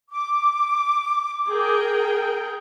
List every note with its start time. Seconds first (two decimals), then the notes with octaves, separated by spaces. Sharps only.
0.11 D6
1.48 G#4 A#4 G5